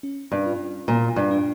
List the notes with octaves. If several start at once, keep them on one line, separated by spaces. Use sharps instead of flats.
C#4
G2
F4
A#2 G3
G2
D4